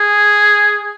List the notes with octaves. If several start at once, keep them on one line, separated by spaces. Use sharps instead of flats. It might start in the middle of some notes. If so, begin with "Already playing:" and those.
Already playing: G#4